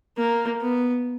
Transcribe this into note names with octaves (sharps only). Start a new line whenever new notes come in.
A#3
B3